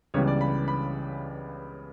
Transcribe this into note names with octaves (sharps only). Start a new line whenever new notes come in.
C#2 C#3 E3 G3 B3 C#5
D5
B5
B5